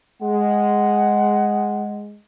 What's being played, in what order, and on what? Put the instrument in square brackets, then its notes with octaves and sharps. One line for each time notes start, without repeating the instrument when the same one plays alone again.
[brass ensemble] G#3 [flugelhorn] F#5